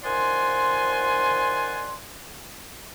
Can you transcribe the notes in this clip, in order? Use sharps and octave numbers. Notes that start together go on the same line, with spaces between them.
D#3 F3 D5 F#5 G#5 C6